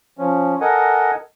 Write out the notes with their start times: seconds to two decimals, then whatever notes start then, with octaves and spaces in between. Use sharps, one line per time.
0.19 F3 C#4
0.61 A4 A#4 D#5 F#5 G#5